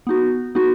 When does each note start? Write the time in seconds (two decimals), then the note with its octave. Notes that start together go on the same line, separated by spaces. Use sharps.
0.07 B3 D#4 F#4
0.55 B3 D#4 F#4